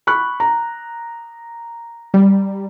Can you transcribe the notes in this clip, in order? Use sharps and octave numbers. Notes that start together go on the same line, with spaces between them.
B5 C#6 F#6
A#5
G3